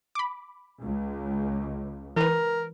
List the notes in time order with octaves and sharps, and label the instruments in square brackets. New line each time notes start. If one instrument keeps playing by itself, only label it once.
[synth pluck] B5 D6
[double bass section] C#2
[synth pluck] E3 B4 [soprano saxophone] A#4